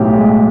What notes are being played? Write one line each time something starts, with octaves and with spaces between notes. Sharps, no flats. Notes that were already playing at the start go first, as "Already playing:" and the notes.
Already playing: B1 A2 G4
G#3